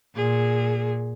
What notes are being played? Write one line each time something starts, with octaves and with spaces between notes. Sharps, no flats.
A#2 G#4